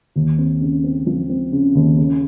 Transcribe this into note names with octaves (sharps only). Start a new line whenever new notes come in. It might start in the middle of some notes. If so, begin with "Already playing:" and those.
D#2
C4
C#3
C4
F3
C4
C#3
D#2
C#3